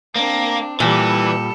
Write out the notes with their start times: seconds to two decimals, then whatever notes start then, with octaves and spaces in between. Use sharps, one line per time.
0.16 A#3 C4 D4
0.80 A#2 E3 G3 A4